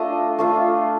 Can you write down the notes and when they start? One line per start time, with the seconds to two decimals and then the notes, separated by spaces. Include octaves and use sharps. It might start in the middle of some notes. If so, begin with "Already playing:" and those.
Already playing: A3 D4 F4 D#5
0.38 A3 D4 F4